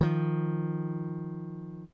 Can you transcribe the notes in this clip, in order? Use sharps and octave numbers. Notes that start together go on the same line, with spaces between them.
D#3 F3